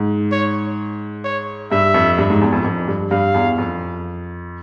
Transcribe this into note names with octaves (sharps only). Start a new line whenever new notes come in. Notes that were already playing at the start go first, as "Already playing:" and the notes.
Already playing: G#2
C#5
C#5
G2 E5
F2
G2
G#2
E2
F2
F2
G2
G2 F5
E2
F2